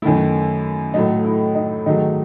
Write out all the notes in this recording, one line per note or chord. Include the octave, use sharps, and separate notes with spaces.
F#2 D#3 A3 E4
A2 F#3 A3 D#4
E4
D#4
G#2 D#3 F#3 A3 D#4